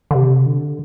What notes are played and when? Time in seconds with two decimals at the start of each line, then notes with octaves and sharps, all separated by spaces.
0.11 D3
0.15 C3
0.46 D3